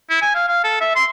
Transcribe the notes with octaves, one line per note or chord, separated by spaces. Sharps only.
E4
G#5
F5
F5
A4
E5
C6